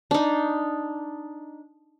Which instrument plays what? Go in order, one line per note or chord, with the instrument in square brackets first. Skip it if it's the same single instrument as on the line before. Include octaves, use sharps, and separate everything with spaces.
[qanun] D4 D#4